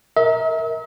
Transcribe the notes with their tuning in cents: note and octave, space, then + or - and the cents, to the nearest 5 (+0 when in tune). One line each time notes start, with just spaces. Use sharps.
A#4 +0 E5 -40